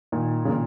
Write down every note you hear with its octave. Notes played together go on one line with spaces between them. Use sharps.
A#2 D#3
C#3
A#2 D#3